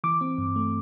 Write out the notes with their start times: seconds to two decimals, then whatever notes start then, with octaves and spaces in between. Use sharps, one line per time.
0.04 E3 D6
0.21 C4
0.38 G2
0.56 A3